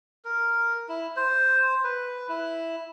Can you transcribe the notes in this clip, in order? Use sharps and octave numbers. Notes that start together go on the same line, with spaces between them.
A#4
E4
C5
B4
E4